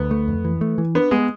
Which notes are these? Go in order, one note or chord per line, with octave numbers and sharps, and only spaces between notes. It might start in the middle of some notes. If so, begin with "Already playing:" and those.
Already playing: D2 B3
A3
F2
E3
A3
E3
B3 D4
G#3 B3